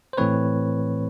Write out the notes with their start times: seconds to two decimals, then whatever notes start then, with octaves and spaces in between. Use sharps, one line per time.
0.13 C5
0.17 A2 E3 A3 C4 B4 C#5